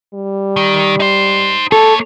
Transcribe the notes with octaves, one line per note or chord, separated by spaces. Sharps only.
G3
D#3
D#4 C5
A#3 A4 C#5